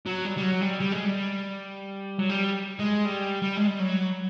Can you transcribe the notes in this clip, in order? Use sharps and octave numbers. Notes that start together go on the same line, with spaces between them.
F#3
G3
G3
F#3
G3
G3
G#3
G3
F#3
G3
G#3
G3
G3
G#3
G3
F#3